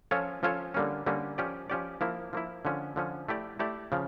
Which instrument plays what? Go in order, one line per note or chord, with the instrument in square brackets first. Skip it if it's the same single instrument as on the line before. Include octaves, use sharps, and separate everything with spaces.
[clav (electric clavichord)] F3 C#4 F4 A4 C#5
F3 C#4 F4 A4 C#5
D3 G3 A#3 C#4
D3 G3 A#3 C#4
F3 C#4 G4 D5
F3 C#4 G4 D5
F3 A#3 E4
F3 A#3 E4
D3 F3 C#4
D3 F3 C#4
A3 E4 G4 D5
A3 E4 G4 D5
C#3 F3